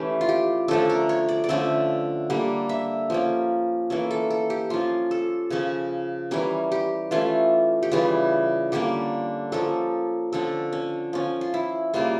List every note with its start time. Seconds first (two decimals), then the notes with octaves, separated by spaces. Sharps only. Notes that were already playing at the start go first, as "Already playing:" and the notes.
Already playing: E3 A3 C#4 G4
0.21 F4
0.29 G4
0.68 D3 F3 A3 C#4 A4
0.89 A#4
1.09 C#5
1.29 D5
1.44 D5
1.49 D3 F3 A3 C#4 E5
2.30 D3 G3 A#3
2.69 E5
3.10 F3 A#3 C#4
3.90 E3 A#3 C#4 A4
4.11 A4
4.30 A4
4.50 G4
4.70 F3 C#4 F4
5.11 A4
5.50 C#3 F3 C#4
6.31 E3 G3 C#4 A#4
6.72 G4
7.11 E3 A3 C#4 F4
7.83 G4
7.92 C#3 E3 G3 F4
8.72 D3 G3 A#3 C#4 G4
9.52 F3 A#3 C#4 A4
10.32 D3 F3 C#4 A4
10.73 C#4
11.13 F3 C#4
11.41 F4
11.54 E4
11.94 C#3 G3 A#3 F4